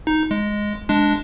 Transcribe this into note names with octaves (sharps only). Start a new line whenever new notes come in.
D#4
G#3
G#3 D4